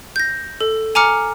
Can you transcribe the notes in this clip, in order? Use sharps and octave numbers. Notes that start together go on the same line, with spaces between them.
G6 A#6
A4
G#5 A#5 D6 F6 C#7